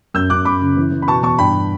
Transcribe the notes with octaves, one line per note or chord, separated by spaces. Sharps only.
F#2 E6 G6
F#2 D6 F#6
F#2 B5 D6
C#3
E3
E3
B5
B2 A5 C#6
E2 A5 C#6
G2 G5 B5